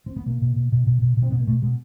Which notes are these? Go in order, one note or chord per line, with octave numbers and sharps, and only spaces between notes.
C4
B3
B2 A#3
B2
B2
B2
B2
B2
B2
C4
B2 B3
A#3
B2 A3
B2 G#3